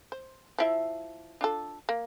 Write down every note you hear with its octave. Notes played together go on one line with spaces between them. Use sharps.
C5
F3 E4 E5
D4 F4 A4
A#3